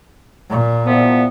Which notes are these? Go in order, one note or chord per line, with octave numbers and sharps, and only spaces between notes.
A#2
C2 F3 B3